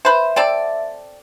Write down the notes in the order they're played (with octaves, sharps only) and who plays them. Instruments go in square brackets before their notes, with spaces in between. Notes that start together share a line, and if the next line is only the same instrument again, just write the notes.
[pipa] B4 C5 [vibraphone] E5
[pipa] C4 A4 D5